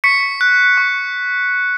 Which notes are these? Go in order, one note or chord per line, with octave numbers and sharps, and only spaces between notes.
C#6 B6 C#7
F#6
C#6